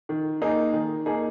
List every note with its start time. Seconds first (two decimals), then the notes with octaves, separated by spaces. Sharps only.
0.09 D#3
0.42 A#3 D#4 G#4
0.73 D#3
1.06 A#3 D#4 G#4